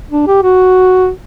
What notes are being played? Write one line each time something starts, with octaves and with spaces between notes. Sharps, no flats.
D4
G4
F#4